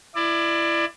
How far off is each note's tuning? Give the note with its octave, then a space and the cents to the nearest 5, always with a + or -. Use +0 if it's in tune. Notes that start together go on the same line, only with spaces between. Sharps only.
E4 +25 D5 +25